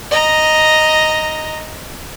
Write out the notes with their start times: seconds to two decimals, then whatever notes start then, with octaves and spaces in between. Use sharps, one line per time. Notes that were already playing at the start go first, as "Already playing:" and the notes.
0.11 D#5 A#5